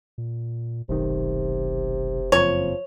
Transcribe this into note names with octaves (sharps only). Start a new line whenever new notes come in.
A#2
F1 B1 C3 D#3
F#1 F2 F3 C#5